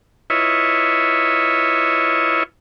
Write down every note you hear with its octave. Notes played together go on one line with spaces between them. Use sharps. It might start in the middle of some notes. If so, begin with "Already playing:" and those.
E4 F4 B4 C#5 D#5 E5